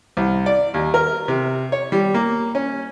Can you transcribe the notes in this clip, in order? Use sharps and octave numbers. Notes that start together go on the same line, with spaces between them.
C2
D5
D#2
A#4
C3
C#5
G3
A#3
C#4